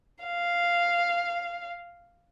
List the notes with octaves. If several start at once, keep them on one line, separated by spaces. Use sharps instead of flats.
F5